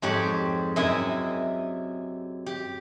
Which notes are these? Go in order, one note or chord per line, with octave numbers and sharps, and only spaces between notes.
F2 G#2 G4 C#5 B5
F#2 C3 E4 G#4 D#5 E5
G4